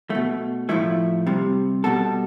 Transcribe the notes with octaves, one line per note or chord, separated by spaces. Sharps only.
B2 A3
A2 F3 A3 E4
C3 G3
B2 G3 A4